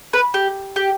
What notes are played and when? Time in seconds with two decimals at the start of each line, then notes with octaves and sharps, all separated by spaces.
0.13 B4
0.34 G4
0.76 G4